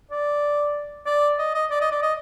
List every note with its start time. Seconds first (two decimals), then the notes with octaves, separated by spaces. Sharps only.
0.11 D5
1.06 D5
1.38 D#5
1.54 D#5
1.70 D5
1.81 D#5
1.91 D5
2.02 D#5